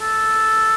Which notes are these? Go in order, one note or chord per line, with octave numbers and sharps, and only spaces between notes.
A4